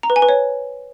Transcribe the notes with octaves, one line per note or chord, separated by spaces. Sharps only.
A#5
B4
G#5
B4
C#5